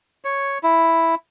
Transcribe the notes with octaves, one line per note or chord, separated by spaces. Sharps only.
C#5
E4